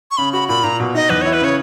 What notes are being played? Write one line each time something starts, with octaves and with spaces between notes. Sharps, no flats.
C#6
C#3 B5
F#4 B5
A#2 B5
A#2 A#5
B2
D#4 D#5
E2 B4
E4 C#5
B4
C#3 C#5